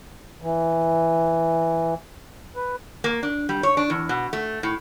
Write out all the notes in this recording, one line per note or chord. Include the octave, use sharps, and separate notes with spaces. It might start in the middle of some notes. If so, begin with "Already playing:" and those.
E3
B4
A#3
D4
G3
C#5
D4
E2
B2
A3
A2